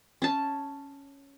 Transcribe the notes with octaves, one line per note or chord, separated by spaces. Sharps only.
C#4 A5